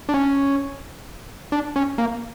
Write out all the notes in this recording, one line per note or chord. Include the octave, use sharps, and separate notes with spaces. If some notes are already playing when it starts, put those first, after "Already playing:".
D4
C#4
D4
C#4
A#3